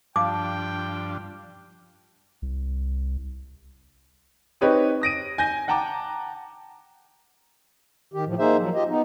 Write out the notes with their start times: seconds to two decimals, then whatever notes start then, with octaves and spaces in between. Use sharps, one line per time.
0.16 G2 F3 D4 F5 G5 A5 D6
2.42 C2
4.61 C4 D#4 G4 B4 C#5
5.02 D#6 A#6 D7 D#7
5.38 G#5 G6 A#6
5.68 F#5 G5 A5 A#5 D6
8.14 D#3 G4
8.26 A2 F3
8.39 A#3 D#4 G#4 C5 E5
8.59 F3 F#3
8.74 F4 G4 D#5
8.89 B3 D#4